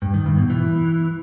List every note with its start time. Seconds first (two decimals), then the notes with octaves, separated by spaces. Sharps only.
0.02 G2
0.14 D#3
0.26 G2
0.38 B2
0.50 E3